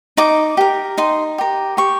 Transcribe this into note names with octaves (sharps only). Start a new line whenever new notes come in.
D#4 D6
G4 A#4
D#4 C6
G4 A#4
G4 C#6